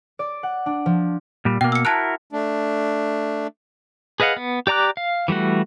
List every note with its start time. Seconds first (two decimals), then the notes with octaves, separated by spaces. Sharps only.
0.19 D5
0.43 F#5
0.66 D4
0.86 F3
1.45 A#2 G3
1.61 B2 A#3 G5
1.72 E6 C#7
1.85 E4 F#4 A#4 A5 A#5 F#6
2.33 A3 D4
4.20 G#4 B4 D#5 F5 F#5
4.37 B3
4.67 G4 D5 A#5 D6 F#6
4.97 F5
5.28 E3 G3 A3 F#4